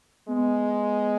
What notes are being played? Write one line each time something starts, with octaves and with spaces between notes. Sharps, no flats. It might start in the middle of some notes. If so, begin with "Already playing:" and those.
G#3 B3